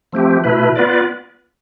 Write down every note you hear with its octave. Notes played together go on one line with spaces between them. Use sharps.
F3 A3 C4 G4
B2 A3 E4 B4
B3 F4 B4 D5